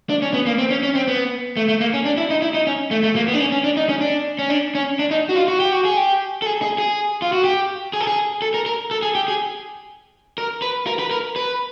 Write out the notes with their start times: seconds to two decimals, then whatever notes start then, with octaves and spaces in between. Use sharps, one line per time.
0.09 D4
0.22 C#4
0.34 B3
0.46 A#3
0.58 C4
0.70 C#4
0.83 C#4
0.95 C4
1.07 B3
1.57 A3
1.69 A3
1.80 A#3
1.94 C#4
2.05 D4
2.17 E4
2.30 D#4
2.42 E4
2.54 D#4
2.67 C#4
2.91 A3
3.03 A3
3.16 A#3
3.28 B3
3.34 D4
3.40 C#4
3.52 C#4
3.64 D4
3.77 D#4
3.89 C#4
4.01 D4
4.39 C#4
4.50 D4
4.75 C#4
4.99 D4
5.11 D#4
5.29 F#4
5.36 F4
5.48 F#4
5.60 G4
5.72 F#4
5.85 G#4
5.97 G4
6.42 A4
6.46 G#4
6.62 G#4
6.78 G#4
7.22 F4
7.33 F#4
7.44 G4
7.93 G#4
8.00 A4
8.07 G#4
8.42 A4
8.54 A#4
8.66 A#4
8.91 A4
9.02 G#4
9.15 G4
9.28 G#4
10.38 A#4
10.62 B4
10.87 A#4
10.99 B4
11.11 A#4
11.36 B4